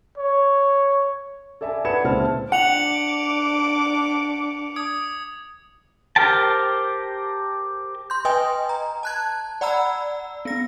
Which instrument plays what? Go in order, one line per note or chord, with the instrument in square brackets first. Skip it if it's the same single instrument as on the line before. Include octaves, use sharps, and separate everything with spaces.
[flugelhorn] C#5
[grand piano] A4 D5 E5 G#5 A5
B4 D5 F#5 G#6 C#7 E7
C#2 A#2 C4 E4 A5 F6
[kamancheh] D4 D6 [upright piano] F#5 [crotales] C#7 F7 F#7
[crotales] D6 D#6 G#6
[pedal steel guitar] G4 A#4 C5 G5 A5
[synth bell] C6 G6
B4 D#5 G5 G#5 D#6
A#5
A5 F#6 G#6
D5 F#5 A#5 B5 E6
B3 A#6